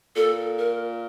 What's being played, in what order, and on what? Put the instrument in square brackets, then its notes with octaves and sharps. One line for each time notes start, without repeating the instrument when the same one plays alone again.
[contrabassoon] A#2 [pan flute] A4
[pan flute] A#4